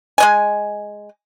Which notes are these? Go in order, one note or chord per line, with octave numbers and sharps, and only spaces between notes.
G#3 D#5 G#5